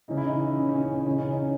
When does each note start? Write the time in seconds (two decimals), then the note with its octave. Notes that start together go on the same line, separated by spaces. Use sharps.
0.08 C#3 E3 D#4
0.17 E4
0.26 D#4
0.57 C#4
0.69 C#4
0.82 C#4
0.94 C#4
1.06 C#3 E3 C#4
1.18 C#4
1.31 D#4